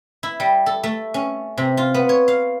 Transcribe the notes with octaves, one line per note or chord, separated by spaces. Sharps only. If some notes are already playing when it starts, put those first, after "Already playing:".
E4
G3
A4
A3
C#4
C3
F4
B3
C#5
F5